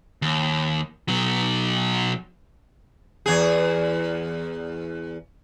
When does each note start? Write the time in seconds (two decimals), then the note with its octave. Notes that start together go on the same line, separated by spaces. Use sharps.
0.22 D#2
1.08 B2 F#3
3.26 E2 G#4